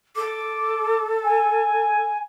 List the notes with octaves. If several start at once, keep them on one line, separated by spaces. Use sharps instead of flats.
A4 D6
G#5